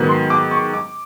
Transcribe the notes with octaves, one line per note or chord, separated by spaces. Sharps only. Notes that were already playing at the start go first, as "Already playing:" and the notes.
Already playing: G#2 D#3 F#3 B3
C6
D6
C#6
D6